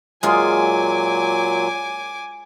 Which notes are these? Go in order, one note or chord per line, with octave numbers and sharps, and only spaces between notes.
A#2 F#3 G#3 F4 G#5 D6